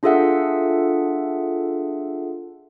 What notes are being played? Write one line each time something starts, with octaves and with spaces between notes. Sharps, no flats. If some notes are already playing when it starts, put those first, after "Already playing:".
D4 F4 G#4 A4 E5 F#5